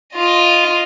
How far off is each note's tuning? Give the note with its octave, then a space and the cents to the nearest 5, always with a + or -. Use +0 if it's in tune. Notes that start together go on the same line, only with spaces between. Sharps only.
F4 +0 D#5 +0